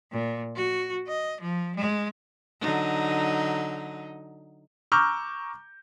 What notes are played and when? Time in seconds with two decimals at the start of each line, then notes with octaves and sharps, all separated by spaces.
0.12 A#2
0.55 F#4
1.07 D#5
1.40 F3
1.76 G#3
2.61 D3 F#3 D#4
4.92 A#5 C#6 D6 E6 F6 G6